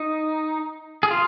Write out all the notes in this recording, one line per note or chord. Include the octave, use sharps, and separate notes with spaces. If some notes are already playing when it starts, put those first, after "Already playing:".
Already playing: D#4
G#4
F4